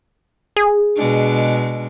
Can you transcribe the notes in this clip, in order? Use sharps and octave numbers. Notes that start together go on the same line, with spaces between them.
G#4
B2 G#3 D4